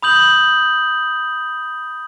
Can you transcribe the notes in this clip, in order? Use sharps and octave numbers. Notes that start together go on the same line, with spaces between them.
B5 D#6 G6 F#7